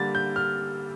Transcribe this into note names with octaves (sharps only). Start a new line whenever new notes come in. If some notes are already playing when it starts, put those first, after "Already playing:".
Already playing: D3 G3 A#3 A6
G6
F6